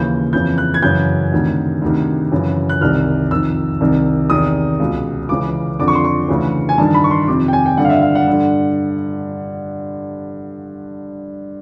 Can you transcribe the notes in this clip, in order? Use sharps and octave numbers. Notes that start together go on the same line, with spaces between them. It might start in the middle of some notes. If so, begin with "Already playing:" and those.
Already playing: D#2 C#3 E3 G6
F2 C#3 E3 G6
F#6
G#6
F#2 C#3 E3 G6
D2 C3 D#3
D2 C3 D#3
F#2 C#3 E3
F#6
C2 C3 D#3 F6
F2 C3 D#3 E6
C2 C3 D#3
E2 C3 D#3 D#6
C#2 B2
C#2 C#3 E3 D6
F2 D3 D6
C#6
C6
C#6
D2 C#3 E3
G#5
G2 D#3 A5
B5
C#6
C6
F2 C3 D#3 D6
G5
G#5
G5
G2 D3 F#5
F5
E5
F5
F#5
G2 D3